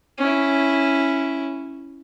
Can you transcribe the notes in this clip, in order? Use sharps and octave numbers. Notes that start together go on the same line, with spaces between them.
C#4 E4